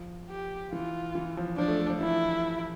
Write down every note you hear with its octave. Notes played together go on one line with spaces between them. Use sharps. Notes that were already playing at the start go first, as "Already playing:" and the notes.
Already playing: F3
G4
E3 F4
E3
F3
F3 D4
A3
A3
F3
E3 E4